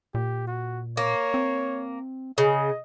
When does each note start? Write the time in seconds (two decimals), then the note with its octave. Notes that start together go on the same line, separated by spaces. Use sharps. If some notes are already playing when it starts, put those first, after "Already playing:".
0.15 A#2 G4
0.47 F#4
0.97 A#3 C#5
1.34 C4
2.38 C#3 D#5